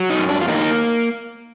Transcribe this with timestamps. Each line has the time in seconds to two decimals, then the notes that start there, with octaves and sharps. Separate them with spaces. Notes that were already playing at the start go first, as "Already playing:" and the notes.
Already playing: F#3
0.10 D#4
0.19 F#2
0.29 D4
0.41 F4
0.48 A#3 D#4